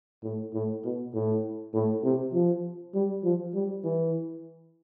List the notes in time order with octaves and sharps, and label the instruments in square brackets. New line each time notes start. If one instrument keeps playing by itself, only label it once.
[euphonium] A2
A2
B2
A2
A2
C3
F3
G3
F3
G3
E3